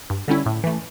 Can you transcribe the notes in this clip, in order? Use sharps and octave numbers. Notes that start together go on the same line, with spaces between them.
G2
D3 G3 C#4 E4
A2
E3 A3